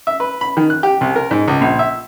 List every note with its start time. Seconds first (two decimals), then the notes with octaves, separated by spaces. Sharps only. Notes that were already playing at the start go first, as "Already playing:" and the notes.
0.07 E5
0.20 B4
0.41 B5
0.57 D#3
0.70 F#6
0.83 G4
1.01 C2
1.16 A#4
1.31 G#2
1.48 C#2
1.61 A#1
1.79 E5